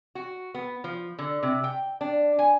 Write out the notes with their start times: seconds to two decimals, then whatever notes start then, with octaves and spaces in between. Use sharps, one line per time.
0.15 F#4
0.55 B3
0.84 F3
1.19 D3
1.43 C3
1.64 G5
2.01 D4
2.39 G#5